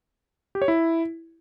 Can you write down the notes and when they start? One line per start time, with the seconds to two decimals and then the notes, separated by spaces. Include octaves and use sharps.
0.55 G4
0.62 C#5
0.68 E4